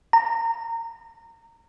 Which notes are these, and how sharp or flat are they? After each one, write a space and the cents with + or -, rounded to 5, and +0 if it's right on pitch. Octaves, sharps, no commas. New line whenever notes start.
A#5 -25